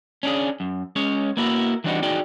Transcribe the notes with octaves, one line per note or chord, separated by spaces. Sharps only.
C#4 D4 G#4
F#2
G#3 C#4 C#5
A#3 B3 E4 F#4 A4 A#4
E3 G3 C4 D4 D#4 F#4
E2 D#4 F#4 G#4 D5 G5